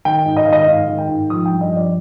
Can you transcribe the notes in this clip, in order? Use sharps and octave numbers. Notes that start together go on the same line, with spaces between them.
D#3 G5
G#2
D#5
D#3 F5
D#5
G#2 F5
D#3
G5
G#2
F3 D#6
G5
G2
D#5
F3 D5